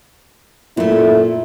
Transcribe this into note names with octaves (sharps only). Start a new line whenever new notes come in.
F#2 A#2 A3 E4